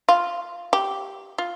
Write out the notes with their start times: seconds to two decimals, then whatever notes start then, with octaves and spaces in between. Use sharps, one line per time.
0.09 F4
0.73 G4
1.38 F4